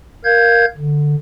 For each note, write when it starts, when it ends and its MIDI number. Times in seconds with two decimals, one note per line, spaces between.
0.25 0.65 70
0.25 0.65 77
0.25 0.65 91
0.25 0.65 92
0.78 1.15 50